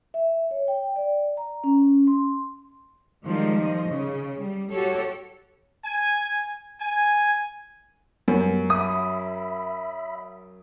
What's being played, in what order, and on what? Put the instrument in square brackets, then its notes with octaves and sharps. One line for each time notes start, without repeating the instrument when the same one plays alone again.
[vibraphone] E5
C#5
G5
D5
A#5
C#4
C6
[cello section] D#3 F3 G3 G#3
F3 D#5
C#3
G3
F#4 G4 A4 C#5
[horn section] G#5
G#5
[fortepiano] F#2 [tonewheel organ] G3 B3
[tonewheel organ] E5 B5 [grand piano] D#6